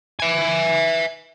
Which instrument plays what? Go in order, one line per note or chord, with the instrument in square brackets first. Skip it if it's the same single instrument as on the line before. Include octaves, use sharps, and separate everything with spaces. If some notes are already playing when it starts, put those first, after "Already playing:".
[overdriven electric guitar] E5 G#5